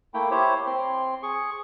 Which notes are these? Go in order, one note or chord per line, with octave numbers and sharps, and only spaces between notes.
A3 A#3 E4 G5
E4 G4 C5 C#5
C4 C6
G#4 C#6